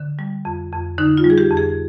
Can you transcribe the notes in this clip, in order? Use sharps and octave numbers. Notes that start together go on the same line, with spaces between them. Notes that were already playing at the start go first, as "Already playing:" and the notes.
Already playing: D3
G3
F2
F2
D3 D#4
F4
G3
G#4
G4
F2
G#4